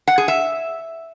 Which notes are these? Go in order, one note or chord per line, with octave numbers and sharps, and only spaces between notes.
F#5
G#4
E5